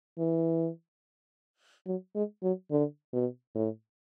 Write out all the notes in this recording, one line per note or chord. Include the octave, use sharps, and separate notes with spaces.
E3
F#3
G#3
F#3
D3
B2
A2